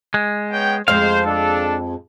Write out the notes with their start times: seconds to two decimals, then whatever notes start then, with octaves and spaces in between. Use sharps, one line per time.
0.14 G#3
0.51 B3 C#5 G5
0.88 F2 G#3 C5 F5
1.26 D4 A4